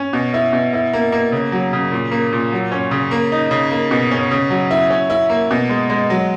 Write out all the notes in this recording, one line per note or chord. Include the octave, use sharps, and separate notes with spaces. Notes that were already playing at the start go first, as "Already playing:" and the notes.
Already playing: C#4
B2
E4
B2
E4
A#3
A#3
C#3
F#3
C#3
A#2
A#3
A#2
F#3
C#4
C#3
A#3
D#4
C#3
A#3
B2
C#4
C#3
F#3
E4
C#4
E4
A#3
B2
G#3
G#3
F#3